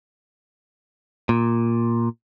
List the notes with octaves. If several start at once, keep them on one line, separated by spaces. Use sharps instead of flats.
A#2